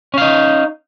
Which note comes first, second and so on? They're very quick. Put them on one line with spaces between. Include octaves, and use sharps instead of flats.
C#4 F5 D#4